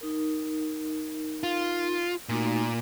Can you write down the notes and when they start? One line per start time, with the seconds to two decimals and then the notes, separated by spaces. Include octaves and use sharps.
0.01 D#4 A#4
1.43 F4
2.29 A#2 A3 D#4 F#4